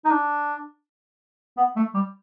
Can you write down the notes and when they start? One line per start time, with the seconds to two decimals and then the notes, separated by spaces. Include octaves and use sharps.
0.05 D#4
0.11 D4
1.58 B3
1.76 A3
1.94 G3